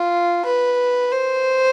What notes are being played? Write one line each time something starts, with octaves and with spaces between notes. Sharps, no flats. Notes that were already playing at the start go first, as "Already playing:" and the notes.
Already playing: F4
B4
C5